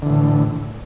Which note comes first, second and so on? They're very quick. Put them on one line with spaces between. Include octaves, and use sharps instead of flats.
D3 E3 A2